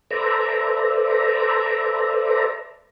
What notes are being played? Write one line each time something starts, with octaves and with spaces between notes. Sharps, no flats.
A4 B4 C5 D5 E5 A#5